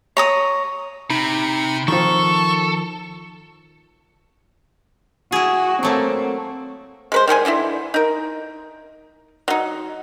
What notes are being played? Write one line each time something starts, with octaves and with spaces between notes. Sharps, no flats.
C#5 A#5 D#6
C3 D#4 B5
D#3 F3 A4 C#6
E4 F#4 G#4
F#3 A3 A#3 C4
G#3 B4 C5
D#3 G3 G#3 G#5
D3 E3 C#4 E4
D#4 A#4
F#3 D#4